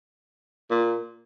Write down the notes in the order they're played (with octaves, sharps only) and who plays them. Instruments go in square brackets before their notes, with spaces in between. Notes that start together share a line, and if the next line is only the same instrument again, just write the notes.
[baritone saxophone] A#2